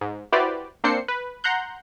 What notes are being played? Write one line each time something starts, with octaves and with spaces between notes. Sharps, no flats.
G#2
E4 F#4 G4 B4 C5 D5
A#3 C4 D4 C5 C7 C#7
B4
F#5 A#5 C6 F#6 G6